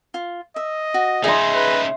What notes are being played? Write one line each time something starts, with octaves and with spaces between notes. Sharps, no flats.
F4
D#5 E5
F#4
C#3 D#4 G#4 E5 C6
B4